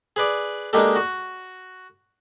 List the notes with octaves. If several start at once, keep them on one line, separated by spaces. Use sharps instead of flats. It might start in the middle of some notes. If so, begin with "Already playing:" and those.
G#4 B4 D5
G#3 A#3 D4 D#4 G4 A4
F#4